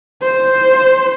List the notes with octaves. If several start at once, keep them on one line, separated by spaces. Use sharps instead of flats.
C5